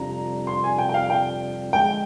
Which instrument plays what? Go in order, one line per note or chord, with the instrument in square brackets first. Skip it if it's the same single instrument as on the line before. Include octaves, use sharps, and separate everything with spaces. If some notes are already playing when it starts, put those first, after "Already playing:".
Already playing: [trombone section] F2 C3 G3 D4 F4 [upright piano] A#5
[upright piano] C6
G#5
G5
G5
F5
G5
[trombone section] D3 F3 G#3 [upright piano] G5